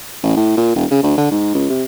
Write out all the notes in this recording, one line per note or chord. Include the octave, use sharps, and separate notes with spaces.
A1
A2
A#2
E1
C#3
D2
D3
G#2
C#2
C3